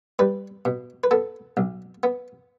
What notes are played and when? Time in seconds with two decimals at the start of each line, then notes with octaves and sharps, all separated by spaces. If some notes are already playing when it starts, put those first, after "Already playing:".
0.19 G3 B4
0.65 B2
1.04 B4
1.11 B3 A4
1.57 B1
2.03 B3